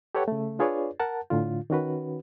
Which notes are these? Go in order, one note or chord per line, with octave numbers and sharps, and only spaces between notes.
G4 A4 B4 C#5 F#5 G5
C#3 A3
D4 F4 G#4 B4 C#5 D5
A#4 F#5 A5
A2 D3 F4
D#3 C#4 F#4 B4